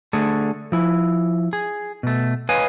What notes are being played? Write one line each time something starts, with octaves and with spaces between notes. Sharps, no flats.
D3 A3 G#4 A4
F3 E4
G#4
B2 A3
B4 C#5 D#5 F5 G#5